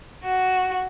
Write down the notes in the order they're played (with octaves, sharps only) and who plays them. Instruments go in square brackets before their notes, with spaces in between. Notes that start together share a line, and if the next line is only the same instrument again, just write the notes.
[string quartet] F#4